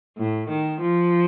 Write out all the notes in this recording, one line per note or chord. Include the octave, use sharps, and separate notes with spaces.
A2
D#3
F3